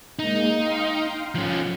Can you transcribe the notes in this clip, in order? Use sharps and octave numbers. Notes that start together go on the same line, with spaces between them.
G#3 A#3 D#4
F5 G5 C6
F3 C#4